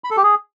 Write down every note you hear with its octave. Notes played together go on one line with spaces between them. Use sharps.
B5
A4
G4
G#4